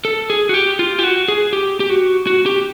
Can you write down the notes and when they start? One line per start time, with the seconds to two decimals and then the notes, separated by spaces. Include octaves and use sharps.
0.05 A4
0.30 G#4
0.49 F#4
0.54 G4
0.79 F4
0.99 G4
1.04 F#4
1.28 G#4
1.53 G4
1.80 G4
1.90 F#4
2.27 F#4
2.46 G4